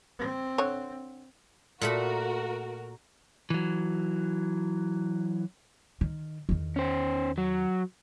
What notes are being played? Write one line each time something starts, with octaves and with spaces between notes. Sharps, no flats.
C4
D3 C#5
A#2 A3 F#4 A#4 B5
E3 F#3
D#3
E2 D#3
C#4 C5
F#3